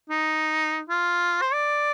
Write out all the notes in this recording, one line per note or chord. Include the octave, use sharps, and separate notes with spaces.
D#4
F4
C5
D5